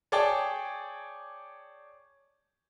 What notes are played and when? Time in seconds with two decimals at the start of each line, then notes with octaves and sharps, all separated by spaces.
0.12 G#4 C#5 D5 G5 A5